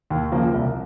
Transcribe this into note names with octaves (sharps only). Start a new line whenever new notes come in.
D#2
C#3 F3 A#3
C2